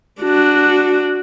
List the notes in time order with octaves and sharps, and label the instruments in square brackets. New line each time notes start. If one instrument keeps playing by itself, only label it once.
[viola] D4 F#4